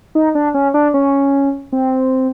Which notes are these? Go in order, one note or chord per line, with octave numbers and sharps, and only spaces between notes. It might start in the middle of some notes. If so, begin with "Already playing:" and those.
D#4
D4
C#4
D4
C#4
C4